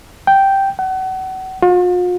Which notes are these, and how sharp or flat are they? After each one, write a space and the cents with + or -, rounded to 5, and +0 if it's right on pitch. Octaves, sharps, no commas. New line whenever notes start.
G5 -5
F#5 +30
F4 +45